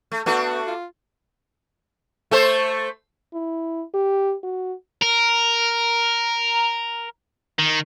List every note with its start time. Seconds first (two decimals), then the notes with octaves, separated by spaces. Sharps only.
0.11 A3
0.26 A3 B3 D4 F#4
0.67 F4
2.31 A3 A4 C5
3.34 E4
3.94 G4
4.43 F#4
5.02 A#4
7.59 D#3